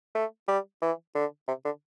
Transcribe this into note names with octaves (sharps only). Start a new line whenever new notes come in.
A3
G3
E3
D3
C3
D3